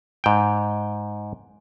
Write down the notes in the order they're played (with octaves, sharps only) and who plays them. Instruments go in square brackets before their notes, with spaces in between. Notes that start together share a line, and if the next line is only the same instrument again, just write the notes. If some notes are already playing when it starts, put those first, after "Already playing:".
[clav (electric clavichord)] G#2 G5